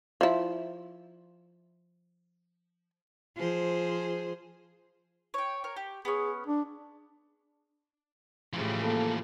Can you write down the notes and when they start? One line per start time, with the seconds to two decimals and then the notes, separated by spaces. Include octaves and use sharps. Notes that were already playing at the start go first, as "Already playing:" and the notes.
0.21 F3 E4
3.36 F3 G#4 C5
5.34 C#5 G5
5.64 A#4 C#5
5.76 G4
6.05 B3 C#4 G#4
6.47 D4
8.53 A2 C#3 E3 F3 G3
8.82 A#3 A4